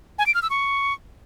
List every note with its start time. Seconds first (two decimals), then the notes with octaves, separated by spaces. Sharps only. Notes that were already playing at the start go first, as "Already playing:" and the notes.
0.19 G#5
0.26 D7
0.34 F6
0.42 E6
0.50 C#6